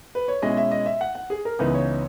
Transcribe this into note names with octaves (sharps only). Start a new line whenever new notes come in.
B4
C#5
B2 G#3 C#4 E4 D#5
E5
D#5
E5
F#5
F#5
G#4
A#4
C#2 C#3 E3 B3 D#4 B4
C#5